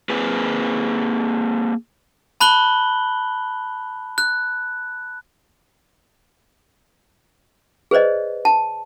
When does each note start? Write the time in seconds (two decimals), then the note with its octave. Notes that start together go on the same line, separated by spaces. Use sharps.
0.10 A#3 C4 G#4 B4
2.40 A5 B5 F#6 F#7 G7
4.18 F#6
7.91 G#4 B4 C5 D5 D#5
8.45 A5